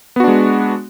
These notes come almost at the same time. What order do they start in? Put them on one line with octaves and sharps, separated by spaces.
B3 F#4 D4 G#3